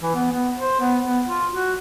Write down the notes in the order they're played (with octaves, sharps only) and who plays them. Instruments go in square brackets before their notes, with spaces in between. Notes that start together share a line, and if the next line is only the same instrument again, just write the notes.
[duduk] E3
B3
B3
C5
B3
B3
F4
F#4